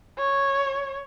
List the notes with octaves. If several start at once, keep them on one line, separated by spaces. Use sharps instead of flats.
C#5